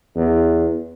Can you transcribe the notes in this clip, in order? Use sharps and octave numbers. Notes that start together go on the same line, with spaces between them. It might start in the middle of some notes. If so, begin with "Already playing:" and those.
E2